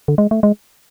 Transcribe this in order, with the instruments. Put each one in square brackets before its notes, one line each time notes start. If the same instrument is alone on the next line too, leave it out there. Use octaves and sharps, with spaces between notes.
[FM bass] D3
G#3
A3
G#3